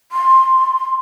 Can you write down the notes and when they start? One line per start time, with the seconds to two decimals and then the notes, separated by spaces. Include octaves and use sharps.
0.12 C6